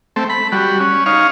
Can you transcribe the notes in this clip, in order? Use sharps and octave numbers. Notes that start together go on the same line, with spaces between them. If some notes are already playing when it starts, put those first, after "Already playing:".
A3 C4
B5
G3 F#4
C#4
D#4 C#5 F5